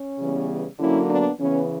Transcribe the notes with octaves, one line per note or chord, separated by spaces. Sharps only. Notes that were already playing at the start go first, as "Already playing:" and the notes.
Already playing: C#4
C#3 E3 G3 B3
D3 F#3 A#3 C#4 E4
B3 D4
C#3 E3 B3 C#4